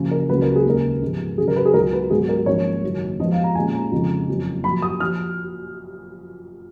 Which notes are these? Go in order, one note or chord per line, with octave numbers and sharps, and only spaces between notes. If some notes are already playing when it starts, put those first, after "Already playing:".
Already playing: F#1 F#2 C#3 F3
A#4
C#2 C#3 F#3 A#3 B4
A#4
G#4
D#2 C#3 G#3 D#4 A#4
G#2 F3 G#3 B3
F#2 C#3 F#3 G#4
A#4
B4
G#4
C#2 B2 F#3 B3 D#4 A#4
B4
G#2 F#3 B3 G#4
A#4
G#1 G#2 F3 A#3 C#4 C#5
F#1 F#2 D#3
F2 F3 G#3 B3 D#5
F5
A#5
A#1 A#2 G#3 C#4 G#5
A#5
F2 C#3 G#3 B3 D#4
F#1 F2 F3 A#3 C#4
F#2 F3 A#3 B5
D#6
F3 F6